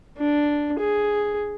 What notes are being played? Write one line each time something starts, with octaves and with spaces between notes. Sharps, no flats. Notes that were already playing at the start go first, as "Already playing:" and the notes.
D4
G#4